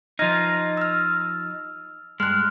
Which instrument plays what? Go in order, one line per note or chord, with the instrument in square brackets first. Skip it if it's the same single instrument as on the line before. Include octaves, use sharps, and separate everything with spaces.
[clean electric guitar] F3 D#4 [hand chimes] F6 G#6 A#6
[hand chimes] E6 F6
[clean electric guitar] G2 G#3 [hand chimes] F6 F#6